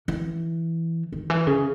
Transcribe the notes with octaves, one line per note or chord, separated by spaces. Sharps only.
E3
D#3
E3
C#3